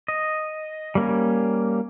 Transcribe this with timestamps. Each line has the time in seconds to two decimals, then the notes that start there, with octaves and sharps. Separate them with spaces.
0.08 D#5
0.95 G3 A#3 C#4